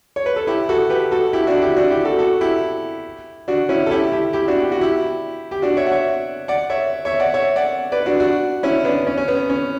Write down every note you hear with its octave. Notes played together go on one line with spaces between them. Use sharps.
C#5
B4
A4
E4 G4
F#4 A4
G4 B4
F#4 A4
E4 G4
D4 F#4
E4 G4
D4 F#4
E4 G4
F#4 A4
F#4 A4
E4 G4
D4 F#4
C#4 E4
A4
E4 G4
E4 G4
E4 G4
D4 F#4
G4
F#4
E4 G4
G4
D4 F#4
C#5 E5
F#5
C#5 E5
D5 F#5
C#5 E5
C#5 E5
D5 F#5
C#5 E5
D5 F#5
B4 D5
D4 F#4
D4 F#4
C#4 E4
B3 D4
C#4
C#4
B3
C#4